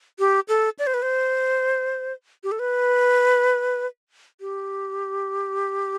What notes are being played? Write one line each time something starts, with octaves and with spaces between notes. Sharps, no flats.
G4
A4
D5
C5
B4
C5
G4
A4
B4
G4